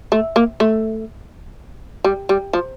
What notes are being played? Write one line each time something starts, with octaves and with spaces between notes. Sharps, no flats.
A3
A#3
A3
G3
G3
F3